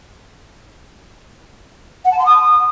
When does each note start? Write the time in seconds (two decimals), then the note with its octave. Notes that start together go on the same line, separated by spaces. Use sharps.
2.04 F#5
2.11 A5
2.18 C6
2.25 D#6